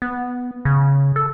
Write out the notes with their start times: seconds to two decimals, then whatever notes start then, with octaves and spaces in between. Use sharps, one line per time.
0.02 B3
0.65 C#3
1.16 A4